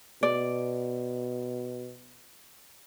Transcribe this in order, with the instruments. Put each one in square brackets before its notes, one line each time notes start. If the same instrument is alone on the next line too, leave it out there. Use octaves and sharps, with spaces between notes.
[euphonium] B2 [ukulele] D5